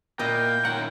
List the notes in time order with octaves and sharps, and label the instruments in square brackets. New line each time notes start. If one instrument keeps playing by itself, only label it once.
[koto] A#2 E4 D#5 [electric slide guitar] A#3 [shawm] G5
[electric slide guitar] D#3 C#4 A#4 [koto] F#5